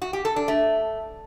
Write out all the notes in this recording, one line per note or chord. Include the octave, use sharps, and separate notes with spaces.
F#4
G4
A4
D4
A3